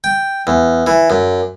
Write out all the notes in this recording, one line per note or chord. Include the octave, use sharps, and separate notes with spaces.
G5
E2
E3
F#2